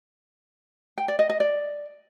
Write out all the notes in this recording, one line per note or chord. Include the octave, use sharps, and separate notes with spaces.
G5
D5
D#5
D#5
D5